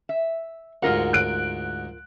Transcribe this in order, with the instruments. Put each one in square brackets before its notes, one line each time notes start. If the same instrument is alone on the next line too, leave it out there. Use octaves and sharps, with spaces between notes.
[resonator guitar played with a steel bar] E5
[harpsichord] D2 G#2 [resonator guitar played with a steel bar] F4 A#4 F#5
[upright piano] F#6 D7